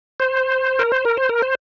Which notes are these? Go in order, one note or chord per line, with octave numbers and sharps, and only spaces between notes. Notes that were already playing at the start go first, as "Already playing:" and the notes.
C5
A#4
C5
A#4
C5
A#4
C5